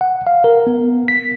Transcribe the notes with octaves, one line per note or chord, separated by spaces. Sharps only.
F#5
F5
A#4
B3
B6